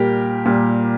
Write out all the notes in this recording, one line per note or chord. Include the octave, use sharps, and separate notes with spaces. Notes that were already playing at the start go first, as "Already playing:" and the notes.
Already playing: A#2 G3 G4 A#4
A#2 G3